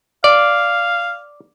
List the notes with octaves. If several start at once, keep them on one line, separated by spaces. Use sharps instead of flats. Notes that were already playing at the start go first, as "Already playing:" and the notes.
D5 F5